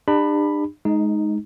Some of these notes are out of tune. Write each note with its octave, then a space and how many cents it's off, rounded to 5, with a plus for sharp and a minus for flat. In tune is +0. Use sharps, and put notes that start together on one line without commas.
D4 +35 G4 +40 B5 +0
G#3 +25 D#4 +0